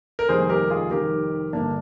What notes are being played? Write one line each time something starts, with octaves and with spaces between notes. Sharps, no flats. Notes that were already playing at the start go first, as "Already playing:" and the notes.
A#4
F1 D#2 D#3 G3 G#4 C5
G4 A#4
F4 G#4
F1 F2 D#3 G3 G4 A#4
G1 G2 D3 A#3 D4